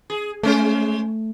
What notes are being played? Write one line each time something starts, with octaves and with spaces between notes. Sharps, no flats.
G#4
G#3 A3 C#4 C5